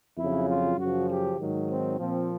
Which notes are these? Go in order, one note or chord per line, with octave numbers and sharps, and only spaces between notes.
F2 C#3 F#3 E4
F4
F#2 C#3 F3 F#4
G4
G#2 D#3 F#3
C4
A#2 F3 C4